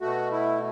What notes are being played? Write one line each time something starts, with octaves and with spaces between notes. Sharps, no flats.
B2 A3 F#4
E4